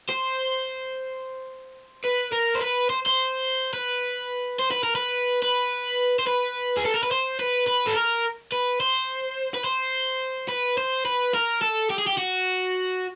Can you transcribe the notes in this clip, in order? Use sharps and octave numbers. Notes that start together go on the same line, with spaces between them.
C5
B4
A#4
C5
B4
C5
C5
B4
C5
B4
A#4
B4
B4
C5
B4
G#4
A4
A#4
B4
C5
B4
B4
A4
A#4
B4
C5
B4
C5
B4
C5
B4
A#4
A4
G4
G#4
G4
F#4